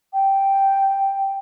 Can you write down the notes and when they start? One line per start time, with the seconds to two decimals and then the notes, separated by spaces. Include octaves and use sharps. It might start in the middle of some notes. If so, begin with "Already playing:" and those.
0.13 G5